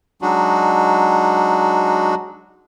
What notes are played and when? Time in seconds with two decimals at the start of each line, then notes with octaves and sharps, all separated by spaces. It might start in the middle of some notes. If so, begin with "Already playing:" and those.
0.22 F#3 G#3 D4 D#4 F#4